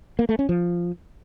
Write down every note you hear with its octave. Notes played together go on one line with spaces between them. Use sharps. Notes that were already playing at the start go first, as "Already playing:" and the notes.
A#3
A3
C#4
F3